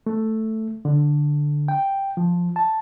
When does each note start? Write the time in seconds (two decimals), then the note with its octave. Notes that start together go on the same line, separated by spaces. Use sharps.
0.06 A3
0.85 D3
1.68 G5
2.17 F3
2.56 A5